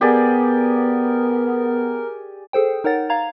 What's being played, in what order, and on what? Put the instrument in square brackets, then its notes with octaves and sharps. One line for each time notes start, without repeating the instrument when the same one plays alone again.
[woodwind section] B3 [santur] G4 G#4 D5 [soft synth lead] A#4
[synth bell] G#4 A4 C5 G5
D#4 A#4 C#5 F#5 A6
F5 A#5 G#6 F7